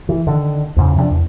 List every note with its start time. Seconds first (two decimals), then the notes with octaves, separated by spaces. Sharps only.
0.09 E3
0.27 D3 D#3
0.76 E2 G#2 C#3
0.96 C3 F3 B3 D4
1.11 E2